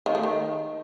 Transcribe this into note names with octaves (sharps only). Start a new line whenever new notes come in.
D#3
A3
D#3